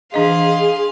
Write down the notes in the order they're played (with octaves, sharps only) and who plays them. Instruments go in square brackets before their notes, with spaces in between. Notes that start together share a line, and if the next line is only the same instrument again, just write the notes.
[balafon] E3 D4 D#5 [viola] G#4 [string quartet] F5 C6